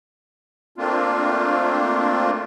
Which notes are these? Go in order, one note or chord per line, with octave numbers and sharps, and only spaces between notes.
A3 A#3 C4 D4 F4